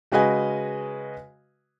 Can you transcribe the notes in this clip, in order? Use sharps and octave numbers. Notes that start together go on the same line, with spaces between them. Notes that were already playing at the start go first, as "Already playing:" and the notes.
C#3 G#3 F#4 B4 D#5 G#5